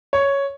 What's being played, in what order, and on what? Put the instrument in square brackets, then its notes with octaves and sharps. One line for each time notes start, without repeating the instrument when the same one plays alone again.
[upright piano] C#5